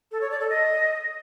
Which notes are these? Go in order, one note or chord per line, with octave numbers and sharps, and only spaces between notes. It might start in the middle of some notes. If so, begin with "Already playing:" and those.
A4
C#5
D5
A4
D#5